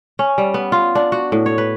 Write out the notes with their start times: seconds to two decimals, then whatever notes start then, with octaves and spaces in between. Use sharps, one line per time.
0.19 C#4
0.38 G3
0.54 B3
0.72 F4
0.95 D4
1.12 F#4
1.32 A2
1.46 C#5
1.58 B4